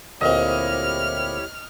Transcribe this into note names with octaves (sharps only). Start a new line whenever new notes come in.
D2 A#2 C4 E4 G4 C#5 D#5 F6